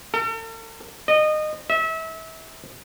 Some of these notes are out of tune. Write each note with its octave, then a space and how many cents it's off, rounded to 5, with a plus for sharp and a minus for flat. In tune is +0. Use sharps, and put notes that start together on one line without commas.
A4 +45
D#5 -25
E5 -30